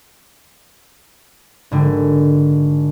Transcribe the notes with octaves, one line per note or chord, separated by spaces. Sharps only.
G#1 D3